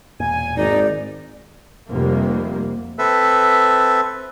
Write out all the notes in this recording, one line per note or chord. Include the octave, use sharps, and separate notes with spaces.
E1 A#2 G#5
G#1 D#4 D5
F1 C3 G3 A#3
C4 A4 B4 E5